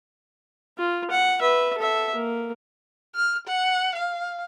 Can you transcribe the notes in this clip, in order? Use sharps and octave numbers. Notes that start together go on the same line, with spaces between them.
F4
F#5
B4 E5
A4 E5
A#3
F6
F#5
F5